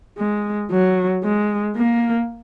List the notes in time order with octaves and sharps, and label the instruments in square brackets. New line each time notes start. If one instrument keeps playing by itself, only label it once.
[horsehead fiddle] G#3
F#3
G#3
A#3